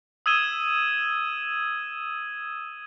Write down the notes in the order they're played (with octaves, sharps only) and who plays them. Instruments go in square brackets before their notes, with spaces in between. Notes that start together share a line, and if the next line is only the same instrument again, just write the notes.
[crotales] D#6 E6 G#6 D#7 E7 G7